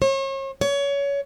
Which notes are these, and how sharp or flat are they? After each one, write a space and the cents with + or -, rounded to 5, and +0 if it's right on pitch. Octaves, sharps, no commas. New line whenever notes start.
C#5 -40
C#5 +25